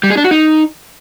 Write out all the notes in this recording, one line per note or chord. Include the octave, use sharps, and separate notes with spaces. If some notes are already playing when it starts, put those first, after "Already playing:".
G3
G#4
D4
F#4
D#4